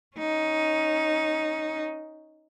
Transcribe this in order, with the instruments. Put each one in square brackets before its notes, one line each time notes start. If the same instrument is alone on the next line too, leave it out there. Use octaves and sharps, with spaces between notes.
[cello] C#4 D#4